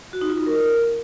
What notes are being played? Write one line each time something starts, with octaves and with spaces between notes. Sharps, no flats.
F#4
D#4
F4
D#4
A#4